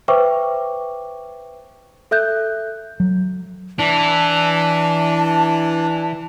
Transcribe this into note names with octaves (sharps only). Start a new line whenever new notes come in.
B4 C5 E5 G5 C#6 D6
A4 E5 F#6 G6
F#3
E3 D4 A5